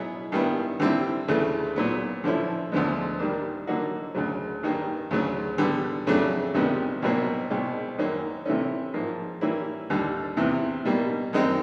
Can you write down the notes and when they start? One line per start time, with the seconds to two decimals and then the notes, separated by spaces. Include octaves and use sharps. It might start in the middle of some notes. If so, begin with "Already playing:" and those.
Already playing: B2 F#3 B3 E4 G#4
0.32 G2 D#3 G3 B3 E4
0.80 D3 G3 C4 E4
1.28 D2 C#3 E3 A3
1.76 A#2 F#3 B3
2.24 D3 F3 A3 C#4 E4
2.72 D2 D3 F3 G#3 B3
3.19 D#3 G3 A#3 D4
3.67 D3 F#3 A#3 D#4 F#4
4.15 D2 C#3 F#3
4.63 G2 D#3 G3 A#3
5.11 D2 C#3 F#3
5.58 D3 G3 B3
6.07 F2 C#3 F#3 A3 D4
6.54 C#2 C3 D#3 G3 B3
7.02 C2 B2 F#3 A#3
7.50 C2 B2 G#3
7.98 F#2 D#3 F#3 A#3 C#4
8.46 C3 E3 A3 C#4
8.94 G#2 F3 A#3
9.41 E3 G3 A#3 C#4 E4
9.90 D#2 D3 G3
10.37 E2 C3 E3
10.85 B2 G3 A#3
11.33 F#2 D#3 G#3 C4 D#4